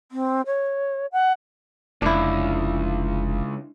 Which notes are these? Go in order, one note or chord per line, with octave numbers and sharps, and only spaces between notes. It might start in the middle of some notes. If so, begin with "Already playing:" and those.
C4
C#5
F#5
F1 C#2 D4 E4